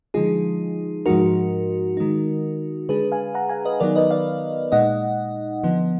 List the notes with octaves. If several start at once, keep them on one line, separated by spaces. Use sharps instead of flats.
D3 F3 G#3 D#4 F4 G#4
G#2 F3 G#3 D#4 F#4 A#4
D#3 G#3 D#4
D3 G#3 D4 G#4 B4
F5 G#5
F#5 A#5
F5 G#5
B4 D#5
D#3 F#3 B3 D#4 A#4 D5
B4 D#5
D5 F5
A#2 G#3 D#4 D#5 F#5
D3 F3 B3